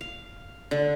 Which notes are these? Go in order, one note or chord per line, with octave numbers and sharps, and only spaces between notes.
F5
D3